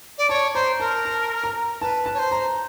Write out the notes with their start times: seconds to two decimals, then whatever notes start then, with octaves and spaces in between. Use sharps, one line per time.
0.18 D5
0.29 C#5 A5
0.54 C5 A#5
0.80 A#4 A5
1.05 A5
1.44 A#5
1.82 B4 A5
2.06 A5
2.14 C#5
2.19 C5
2.31 A#5